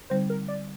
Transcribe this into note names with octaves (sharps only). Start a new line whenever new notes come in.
D3 G3 C4 D#4 C5
A#4
D5